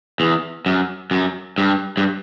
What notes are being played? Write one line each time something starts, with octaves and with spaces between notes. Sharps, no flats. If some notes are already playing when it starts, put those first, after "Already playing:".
E2
F#2
F#2
G2
G2